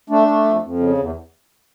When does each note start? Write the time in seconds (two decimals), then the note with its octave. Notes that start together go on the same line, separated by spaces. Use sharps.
0.10 A3 D4
0.28 A3
0.45 F2
0.62 F2
0.80 C#3
0.97 E2